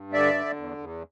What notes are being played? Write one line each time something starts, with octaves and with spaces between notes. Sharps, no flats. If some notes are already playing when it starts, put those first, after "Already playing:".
Already playing: G2
D3 D5 E5
D3
E2
E2